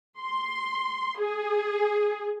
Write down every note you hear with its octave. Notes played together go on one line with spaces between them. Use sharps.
C6
G#4